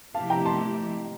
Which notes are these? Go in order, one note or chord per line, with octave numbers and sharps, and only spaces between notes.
C3 F3 A3 E4 G4 F5 A5
G5 A#5
A5 C6